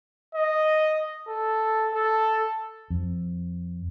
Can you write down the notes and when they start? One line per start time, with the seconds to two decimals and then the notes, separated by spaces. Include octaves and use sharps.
0.35 D#5
1.29 A4
1.94 A4
2.90 F2